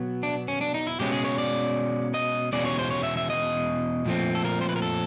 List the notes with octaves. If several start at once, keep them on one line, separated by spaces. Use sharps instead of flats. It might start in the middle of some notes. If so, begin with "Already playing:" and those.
Already playing: B2 F#3 B3
D4
C#4
D4
D#4
E4
B2 G#3 C#4 G4
G#4
C#5
D5
D#5
E2 B2 G#3 C#4 D5
C#5
C5
C#5
E5
E5
D#5
A#2 F3 A3 C4
A4
A#4
C5
B4
A#4
A4